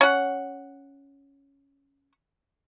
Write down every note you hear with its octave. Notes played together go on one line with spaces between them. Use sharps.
C#4 F#5